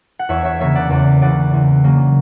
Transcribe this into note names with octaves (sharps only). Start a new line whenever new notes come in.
F#5
E2 C#5 E5
C#5 E5
C#3 E3 A#3 C#5 E5
D5 F#5
E2 D5 F#5
C#3 E3 A#3 D5 F#5
E2
C#3 F#3 A#3